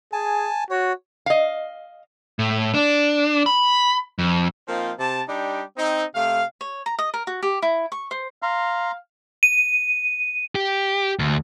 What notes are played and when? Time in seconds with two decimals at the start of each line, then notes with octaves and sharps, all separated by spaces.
0.13 G#4 G#5 A5
0.70 F#4 C#5
1.26 D#5 F5
2.39 A2
2.74 D4
3.46 B5
4.19 F2
4.68 F3 A#3 C4 D#4 F4
4.99 C3 A5
5.28 G3 D4 D#4 G4
5.76 C4 D#4
6.15 C3 A3 F5
6.61 C#5
6.86 A#5
6.99 D#5
7.14 A#4
7.27 F#4
7.43 G4
7.62 E4
7.92 C#6
8.11 C5
8.42 F5 A#5 C6
9.43 D#7
10.55 G4
11.19 D2